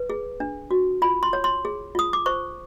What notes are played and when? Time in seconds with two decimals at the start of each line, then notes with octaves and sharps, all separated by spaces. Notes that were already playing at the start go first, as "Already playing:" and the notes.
Already playing: B4
0.10 G#4
0.40 D4
0.71 F#4
1.02 F4 B5
1.23 C6
1.33 C#5
1.44 C6
1.65 G#4
1.95 F4 D#6
2.13 D6
2.26 C5 C#6